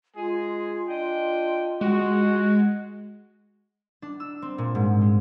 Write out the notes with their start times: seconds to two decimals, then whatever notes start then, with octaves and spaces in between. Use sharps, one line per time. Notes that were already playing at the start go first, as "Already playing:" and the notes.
0.16 G#3 F4 G#4
0.89 D4 D#5 G5
1.81 G#3 F#4
4.02 D4
4.20 E6
4.42 C4
4.58 A#2
4.75 G#2
5.01 G#3